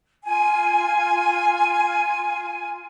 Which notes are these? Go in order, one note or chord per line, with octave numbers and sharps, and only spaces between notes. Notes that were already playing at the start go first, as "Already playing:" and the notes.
F4 G#5